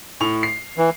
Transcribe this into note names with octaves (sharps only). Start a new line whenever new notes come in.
A2 C#6 F7
C7
E3